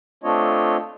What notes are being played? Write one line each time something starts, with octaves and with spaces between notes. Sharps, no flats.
A3 C4 D4 F4 C#5 D#5